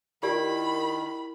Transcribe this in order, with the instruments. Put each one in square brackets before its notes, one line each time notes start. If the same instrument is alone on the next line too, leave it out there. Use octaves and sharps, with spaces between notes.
[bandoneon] D#3 [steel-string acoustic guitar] E4 A#4 G5 [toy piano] F4 G4 D5 [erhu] B5